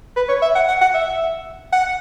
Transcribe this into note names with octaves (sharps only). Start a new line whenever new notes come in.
B4
C#5
E5
F#5
F#5
F#5
E5
F#5